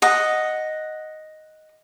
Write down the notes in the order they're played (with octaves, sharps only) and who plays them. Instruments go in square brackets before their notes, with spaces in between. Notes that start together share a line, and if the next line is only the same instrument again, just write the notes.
[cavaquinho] D#5 F#5